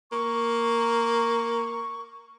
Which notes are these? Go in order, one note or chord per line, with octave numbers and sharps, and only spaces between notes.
A#3 C#6